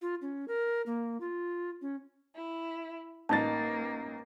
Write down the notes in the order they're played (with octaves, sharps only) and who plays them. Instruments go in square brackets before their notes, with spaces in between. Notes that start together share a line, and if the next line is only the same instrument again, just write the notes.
[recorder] F4
C#4
A#4
A#3
F4
C#4
[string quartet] E4
[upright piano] A1 D#4 A6 [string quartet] A#3 [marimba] A5